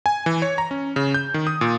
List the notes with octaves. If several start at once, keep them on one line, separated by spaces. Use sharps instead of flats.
G#5
E3
C#5
A#5
C#4
C#3
G6
D#3
D#6
A#2